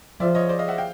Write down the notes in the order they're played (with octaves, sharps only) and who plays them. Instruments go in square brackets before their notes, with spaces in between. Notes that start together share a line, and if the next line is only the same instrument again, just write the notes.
[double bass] F3 [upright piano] D5 E5
[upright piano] C#5 D#5
C5 D5
D#5 F5
E5 F#5
F5 G5